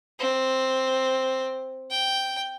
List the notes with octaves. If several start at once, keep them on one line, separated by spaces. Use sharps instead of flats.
C4
G5